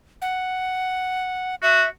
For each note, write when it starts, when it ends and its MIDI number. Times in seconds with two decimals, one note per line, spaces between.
0.22 1.55 78
1.63 1.84 66
1.63 1.89 76